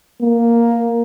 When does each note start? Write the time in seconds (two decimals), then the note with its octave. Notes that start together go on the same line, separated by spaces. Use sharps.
0.22 A#3